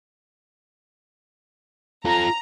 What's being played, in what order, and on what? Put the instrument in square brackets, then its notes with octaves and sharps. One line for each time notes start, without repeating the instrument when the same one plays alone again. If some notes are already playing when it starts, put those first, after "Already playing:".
[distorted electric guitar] F4 A4 [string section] A#5